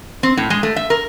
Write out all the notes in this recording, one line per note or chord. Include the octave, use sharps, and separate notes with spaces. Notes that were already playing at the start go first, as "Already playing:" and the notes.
C4
A2
G#3
A3
E5
A#4